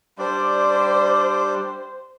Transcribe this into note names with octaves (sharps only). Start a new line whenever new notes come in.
G3 D4 C5 D5